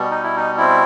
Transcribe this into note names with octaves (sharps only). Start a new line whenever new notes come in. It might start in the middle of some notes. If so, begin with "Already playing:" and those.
Already playing: B2 G3
D#4
E4
D#4
C4 E4